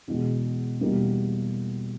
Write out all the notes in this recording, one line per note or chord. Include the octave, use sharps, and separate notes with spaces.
E2 B2 G#3
E2 B2 G3 A#3